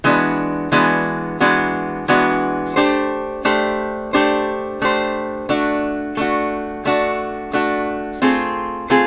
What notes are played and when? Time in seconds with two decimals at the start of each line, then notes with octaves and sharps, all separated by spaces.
0.04 E3 G#3 B3 D4 F#4
0.72 E3 G#3 B3 D4 F#4
1.40 E3 G#3 B3 D4 F#4
2.08 E3 G#3 B3 D4 F#4
2.76 A3 D4 G4 C5
3.45 A3 D4 G4 C5
4.13 A3 D4 G4 C5
4.82 A3 D4 G4 C5
5.49 A3 D4 F#4
6.17 A3 D4 F#4
6.85 A3 D4 F#4
7.53 A3 D4 F#4
8.22 A3 C4 F4 G#4
8.90 A3 C4 F4 G#4